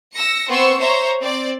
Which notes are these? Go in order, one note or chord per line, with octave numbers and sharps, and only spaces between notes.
E6 A#6 C#7
B3 C4 C5 C#6 E6 C#7
C5 C#5 E5 A#5 C#6
C4 D5